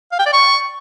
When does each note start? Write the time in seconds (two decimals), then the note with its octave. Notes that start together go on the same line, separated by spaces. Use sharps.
0.12 F5
0.19 G5
0.26 D5
0.33 C#6